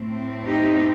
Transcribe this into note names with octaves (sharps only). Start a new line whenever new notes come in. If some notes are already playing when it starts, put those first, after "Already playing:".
Already playing: A2 A3 C4
D#4 G4